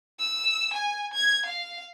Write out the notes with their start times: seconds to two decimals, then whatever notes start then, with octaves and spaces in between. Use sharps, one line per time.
0.19 E6
0.74 G#5
1.14 G#6
1.46 F5